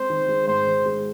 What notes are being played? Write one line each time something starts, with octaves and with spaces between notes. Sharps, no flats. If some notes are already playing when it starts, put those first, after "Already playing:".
Already playing: G#3 C4 C5
D#3
G#3
G#2 C5
D#3
G#3